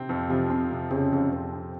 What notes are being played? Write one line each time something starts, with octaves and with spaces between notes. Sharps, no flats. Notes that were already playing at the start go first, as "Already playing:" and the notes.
Already playing: C3 C4
F2
C3 F3
C4
C3
F2 C#3
F2
F2
C4